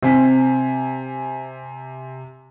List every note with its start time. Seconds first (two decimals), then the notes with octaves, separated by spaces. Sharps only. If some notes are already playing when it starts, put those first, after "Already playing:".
0.02 C3 C4 G#5 B6